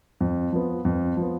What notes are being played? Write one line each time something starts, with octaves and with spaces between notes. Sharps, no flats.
F2
F3 B3
F2
F3 B3